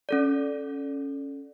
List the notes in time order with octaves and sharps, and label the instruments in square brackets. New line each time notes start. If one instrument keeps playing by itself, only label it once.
[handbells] C#4 A4 D5